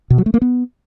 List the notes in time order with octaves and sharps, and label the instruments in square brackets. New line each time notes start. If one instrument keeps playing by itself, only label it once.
[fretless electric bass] B2
F#3
A3
A#3
B3